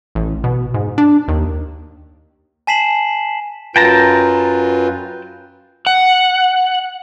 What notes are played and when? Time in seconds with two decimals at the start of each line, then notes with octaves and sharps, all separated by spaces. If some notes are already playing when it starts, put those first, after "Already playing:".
0.15 A1
0.44 B2
0.74 G#2
0.98 D4
1.28 D#2
2.67 G#5 A5 B6 C7 E7 F#7
3.76 F#2 F4 B4 G5 A5 A#5
5.87 F#5